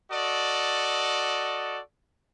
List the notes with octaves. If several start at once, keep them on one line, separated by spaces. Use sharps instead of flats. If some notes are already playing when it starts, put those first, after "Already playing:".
F#4 A4 D5 D#5